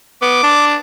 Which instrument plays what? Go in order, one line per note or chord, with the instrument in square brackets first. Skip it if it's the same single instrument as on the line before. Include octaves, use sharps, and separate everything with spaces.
[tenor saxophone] B3 [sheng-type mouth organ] D6
[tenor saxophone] D4